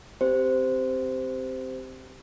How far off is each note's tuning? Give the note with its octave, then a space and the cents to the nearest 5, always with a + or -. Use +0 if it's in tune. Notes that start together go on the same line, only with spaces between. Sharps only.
C4 +0 G4 +0 C5 -15